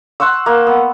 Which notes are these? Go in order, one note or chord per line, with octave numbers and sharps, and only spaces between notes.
F#5 C6 C#6 E6
A#3
B3